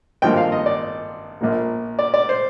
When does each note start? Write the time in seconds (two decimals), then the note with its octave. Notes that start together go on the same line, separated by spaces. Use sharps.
0.22 G#1 G2 F3 A#3 G5
0.37 F5
0.52 D#5
0.66 D5
1.41 A#1 A#2 F3 A#3
1.99 D5
2.14 D5
2.29 C5